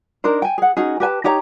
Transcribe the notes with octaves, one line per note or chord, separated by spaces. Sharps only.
D4 D#4 A#4 C5
G5 G#5
G#4 F#5
C#4 D#4 F#4 G#4
G4 B4 G#5 A5
D#4 G4 C#5 A#5